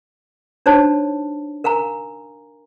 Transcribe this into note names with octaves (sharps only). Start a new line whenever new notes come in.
D4 D#4 F#4 C5 C#5 A5
A#4 F5 G#5 A#5